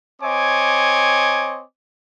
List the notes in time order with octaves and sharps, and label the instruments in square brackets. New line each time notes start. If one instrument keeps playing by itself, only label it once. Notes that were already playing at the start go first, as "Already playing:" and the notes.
[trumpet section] C4 C#5 D#5 G#5 D6